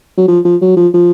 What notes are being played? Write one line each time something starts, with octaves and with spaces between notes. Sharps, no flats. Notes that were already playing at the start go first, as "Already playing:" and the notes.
F#3
F3
F3
F#3
F3
F3